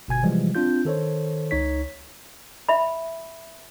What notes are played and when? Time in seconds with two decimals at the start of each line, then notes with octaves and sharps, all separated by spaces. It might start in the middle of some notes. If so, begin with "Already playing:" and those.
0.08 G1 B2 G#5 G#6
0.23 C3 E3 F3 G3 G#3
0.55 C4 D4 F4 G6
0.85 D#3 A4 C5 C#5
1.51 C#2 D#4 C#5 B6
2.69 E5 B5